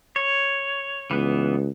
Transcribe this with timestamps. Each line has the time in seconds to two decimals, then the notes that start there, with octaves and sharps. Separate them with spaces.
0.16 C#5
1.11 C#2 E3 B3